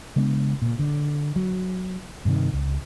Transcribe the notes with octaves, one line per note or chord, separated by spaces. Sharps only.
C#3 G#3 B3 D4
A#2
D3
F#3
G2 C3 D#3
C#2